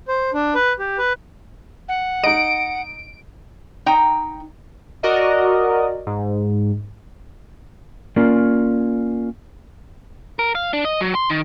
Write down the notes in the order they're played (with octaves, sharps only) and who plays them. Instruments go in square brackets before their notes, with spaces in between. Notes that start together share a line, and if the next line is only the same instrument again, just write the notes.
[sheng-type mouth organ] C5
D4
B4
G4
B4
[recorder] F#5
[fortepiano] D#4 D#5 [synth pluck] D7
[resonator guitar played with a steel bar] D#4 G5 A#5
[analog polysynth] F#4 A#4 D5 D#5
G#2
[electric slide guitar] A#3 C#4 F4 A#4 D5
[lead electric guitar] A#4
F5
D4
D#5
F#3
C6
D#3